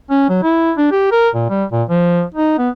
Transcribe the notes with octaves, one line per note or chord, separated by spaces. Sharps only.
C#4
F#3
E4
D4
G4
A#4
A#2
G3
A#2
F3
D#4
B3